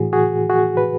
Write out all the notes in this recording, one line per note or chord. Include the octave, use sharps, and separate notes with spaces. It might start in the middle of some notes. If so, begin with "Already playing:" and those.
Already playing: A2 E3 F#4 G#4
F#4 G#4
F#4 G#4
B4